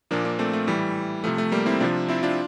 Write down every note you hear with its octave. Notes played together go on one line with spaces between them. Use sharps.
A#2 F3 A#3 D4
A#3 D4
A3 C4
A3
A2 E3 G3
C3 F3 A3
A3
G3 A#3
C4 E4
C3 F3 D4 F4
C4 E4
D4 F4